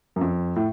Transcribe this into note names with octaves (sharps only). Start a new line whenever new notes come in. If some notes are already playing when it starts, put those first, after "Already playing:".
F#2
F2
A2